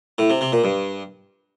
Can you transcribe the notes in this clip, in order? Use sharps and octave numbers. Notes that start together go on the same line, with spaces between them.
A2
C3
C3
A#2
G2